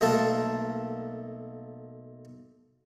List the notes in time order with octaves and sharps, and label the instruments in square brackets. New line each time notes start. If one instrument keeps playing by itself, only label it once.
[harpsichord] B1 A3 A#3 A4 A5